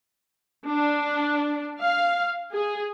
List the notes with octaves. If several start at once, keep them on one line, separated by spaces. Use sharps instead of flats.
D4
F5
G#4